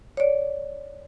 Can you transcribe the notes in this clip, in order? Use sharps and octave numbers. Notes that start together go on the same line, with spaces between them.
C#5 D5